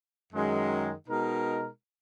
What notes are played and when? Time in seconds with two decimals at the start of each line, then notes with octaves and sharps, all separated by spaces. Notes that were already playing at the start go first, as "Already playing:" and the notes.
0.32 F#2 D#3 G#3
1.08 B2 G#3 D#4 A#4